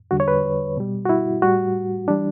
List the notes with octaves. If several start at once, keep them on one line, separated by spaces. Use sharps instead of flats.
E2 D3 G3 F#4
C#5
B4
B2 G3
F#4
E4
A2 G3 F#4
E3 G3 D4